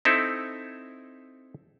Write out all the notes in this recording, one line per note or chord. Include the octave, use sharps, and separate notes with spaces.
C4 D#4 E4 A4